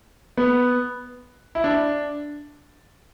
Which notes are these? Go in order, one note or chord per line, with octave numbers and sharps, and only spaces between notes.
B3
E4
D4